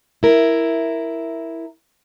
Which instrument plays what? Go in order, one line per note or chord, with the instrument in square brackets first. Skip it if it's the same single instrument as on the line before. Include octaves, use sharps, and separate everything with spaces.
[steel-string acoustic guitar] E4 A#4